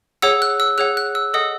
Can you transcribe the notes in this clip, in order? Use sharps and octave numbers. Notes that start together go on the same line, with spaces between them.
G#4 C#5 F#5 E6
F#6
E6
G#4 C#5 F#5 F#6
F#6
E6
A4 D#5 F#5 D#6